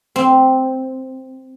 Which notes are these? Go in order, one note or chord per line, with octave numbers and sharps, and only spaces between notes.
C4